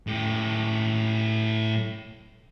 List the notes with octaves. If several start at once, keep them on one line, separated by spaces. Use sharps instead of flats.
A2 G4